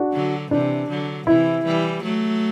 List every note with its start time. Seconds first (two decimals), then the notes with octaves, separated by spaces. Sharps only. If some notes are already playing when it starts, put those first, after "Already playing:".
Already playing: D4 F#4
0.13 D3 F#3
0.51 C3 E3 D4
0.89 D3 F#3
1.27 C3 E3 E4
1.65 E3 G3
2.03 F#3 A3